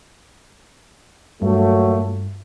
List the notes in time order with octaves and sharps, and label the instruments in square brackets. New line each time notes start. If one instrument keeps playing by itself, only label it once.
[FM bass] G2 [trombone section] A#2 F#3 A3